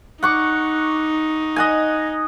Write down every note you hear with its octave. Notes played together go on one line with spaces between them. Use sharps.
D#4 F#5 C#6 D6
D#5 F#5 G#5